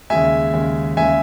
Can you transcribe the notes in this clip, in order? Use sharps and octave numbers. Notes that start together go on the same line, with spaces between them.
D#2 C#3 G#3 E5 G#5
D#2 C#3 G#3
D#2 C#3 G#3 E5 G#5